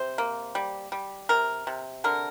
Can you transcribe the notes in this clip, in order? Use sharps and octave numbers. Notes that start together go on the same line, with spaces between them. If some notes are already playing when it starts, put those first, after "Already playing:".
Already playing: C3 C5
A#3
G3
G3
C3 A#4
C3
D3 A#4